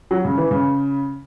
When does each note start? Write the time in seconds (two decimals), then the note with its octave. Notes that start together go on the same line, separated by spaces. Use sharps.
0.11 F#3
0.25 C#3
0.38 E3
0.51 C#3